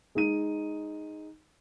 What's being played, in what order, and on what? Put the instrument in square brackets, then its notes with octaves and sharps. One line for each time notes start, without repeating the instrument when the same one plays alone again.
[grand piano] G#3 D#4 D#7